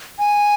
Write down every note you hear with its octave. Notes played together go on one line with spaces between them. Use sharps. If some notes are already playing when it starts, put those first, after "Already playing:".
G#5